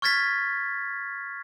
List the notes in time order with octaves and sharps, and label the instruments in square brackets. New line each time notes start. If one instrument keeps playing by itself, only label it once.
[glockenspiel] C#6 F6 G#6 A6 B6